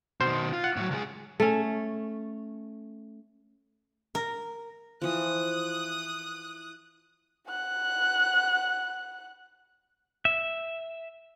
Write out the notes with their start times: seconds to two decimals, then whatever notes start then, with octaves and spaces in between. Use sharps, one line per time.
0.21 B2 D#3 C5
0.53 F4
0.64 F#5
0.77 A2 F#3
0.91 C#2 G#4
1.40 A3 C#4
4.15 A#4
5.02 E3 F3 D#6 F#6
7.48 F#5 F#6
10.25 E5